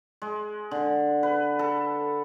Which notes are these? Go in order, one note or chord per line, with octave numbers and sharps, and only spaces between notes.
G#3
D3
B4
A4